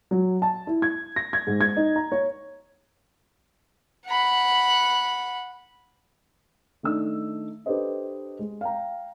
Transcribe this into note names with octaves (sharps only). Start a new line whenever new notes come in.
F#3
A5
E4
G#6
A#6
G#6
G#2
G#6
D#4
A#5
C#5
F#5 B5
D#3 A3 D4 D#4 E6
D4 G4 A4 B4 C5 D#5
G#3
F5 G5 A#5